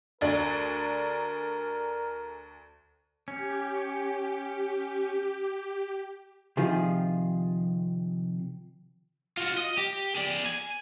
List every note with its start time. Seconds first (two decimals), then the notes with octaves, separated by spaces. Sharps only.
0.21 D2 D4 A#4
3.28 C#4 G4
6.57 C3 D#3 F3 F4 G4 G#4
9.37 F4 F#4
9.58 D#5
9.78 G4
10.15 G#4 D5
10.46 G#5